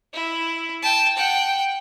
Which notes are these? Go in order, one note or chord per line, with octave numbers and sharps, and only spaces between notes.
E4
G5 A5
F#5 G5